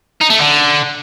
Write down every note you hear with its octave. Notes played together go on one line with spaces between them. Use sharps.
D#4
A3
D3